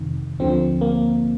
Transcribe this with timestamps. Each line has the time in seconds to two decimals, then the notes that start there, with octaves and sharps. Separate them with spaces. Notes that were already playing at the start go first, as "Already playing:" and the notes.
Already playing: F2 C3 D#3
0.40 D2 D3 F3 C4
0.81 A#3